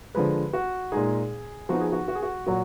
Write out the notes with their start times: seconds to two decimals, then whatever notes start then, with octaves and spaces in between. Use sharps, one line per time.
0.15 D3 F3 G#3 B4
0.53 F#4
0.92 A#2 G#3 D#4 G#4
1.69 F3 B3 D#4 F#4
1.81 G#4
1.92 F#4
2.08 F#4
2.15 G#4
2.23 F#4
2.47 A#2 F#3 F#4